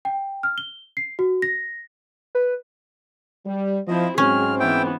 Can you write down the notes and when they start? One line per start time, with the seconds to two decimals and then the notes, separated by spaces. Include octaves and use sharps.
0.05 G5
0.43 F6
0.58 G7
0.97 C7
1.19 F#4
1.42 A#6
2.35 B4
3.46 G3
3.88 F3 C4 E4 D#5
4.18 G#2 F#3 C4 C#4 G#4 F6
4.60 E3 B3 E4 G5